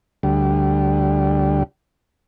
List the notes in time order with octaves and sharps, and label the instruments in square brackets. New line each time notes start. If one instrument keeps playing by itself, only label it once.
[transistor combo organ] D2 G3